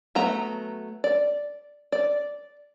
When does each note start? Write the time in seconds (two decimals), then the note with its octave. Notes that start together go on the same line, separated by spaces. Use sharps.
0.15 F#3 A3 B3 A#5
1.04 D5
1.92 D5